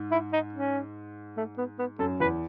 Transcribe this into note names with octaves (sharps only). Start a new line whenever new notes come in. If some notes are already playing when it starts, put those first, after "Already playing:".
Already playing: G#2
E4
D#4
C#4
A3
B3
B3
F#2 A4
E2 B4